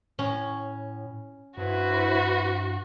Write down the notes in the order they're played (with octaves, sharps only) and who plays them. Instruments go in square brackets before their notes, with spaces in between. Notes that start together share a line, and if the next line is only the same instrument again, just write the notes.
[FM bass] A2 [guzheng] C#4
[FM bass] G2 [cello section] E4 B4 C5 [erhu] F#4